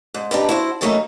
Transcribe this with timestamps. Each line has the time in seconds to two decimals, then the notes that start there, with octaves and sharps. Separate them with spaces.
0.14 G#2
0.31 D4 D#4 G4 B4
0.49 E4 F#4 C5
0.81 B2 E3 F#3 A3 A#3 D#4